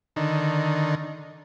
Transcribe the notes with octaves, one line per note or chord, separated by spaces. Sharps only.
D3 D#3